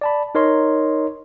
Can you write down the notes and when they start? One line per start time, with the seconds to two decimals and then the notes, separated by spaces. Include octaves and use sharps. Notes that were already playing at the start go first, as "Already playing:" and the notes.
0.01 D5 A5 B5
0.35 D#4 A#4 C#5 D#5 C6